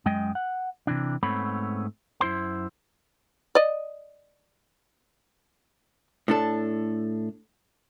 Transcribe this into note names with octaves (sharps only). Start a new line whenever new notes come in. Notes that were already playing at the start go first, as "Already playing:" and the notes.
F#2 G#3 D#5 G5
F#5
C3 E3 D4
G#2 A3 B3 C4 C#5 B5
F#2 E4 C5 C6
D5 D#5
A2 D4 A4